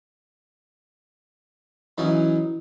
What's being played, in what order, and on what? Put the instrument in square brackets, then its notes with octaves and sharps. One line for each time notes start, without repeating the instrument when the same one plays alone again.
[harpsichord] E3 F#3 C#4 D#4 D#5